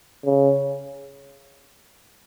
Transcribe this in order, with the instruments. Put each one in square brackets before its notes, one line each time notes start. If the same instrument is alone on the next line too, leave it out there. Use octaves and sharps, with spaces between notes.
[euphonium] C#3